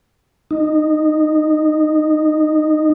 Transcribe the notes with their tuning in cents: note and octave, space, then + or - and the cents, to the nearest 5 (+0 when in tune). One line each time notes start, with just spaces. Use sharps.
D#4 -15